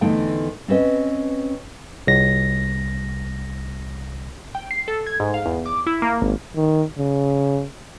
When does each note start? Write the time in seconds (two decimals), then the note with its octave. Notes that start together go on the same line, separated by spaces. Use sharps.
0.01 E2 D3 A3 D#4 G5
0.68 C4 C#4 B4 D#5
2.07 C2 A#6
4.55 G5
4.71 C7
4.88 A4
5.07 G#6
5.20 G#2
5.34 F5
5.46 E2
5.66 D6
5.86 E4
6.02 A#3
6.22 G#1
6.56 D#3
6.98 C#3